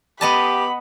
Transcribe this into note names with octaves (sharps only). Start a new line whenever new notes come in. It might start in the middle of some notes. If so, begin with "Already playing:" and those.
B3 G4 D#5 A5 B5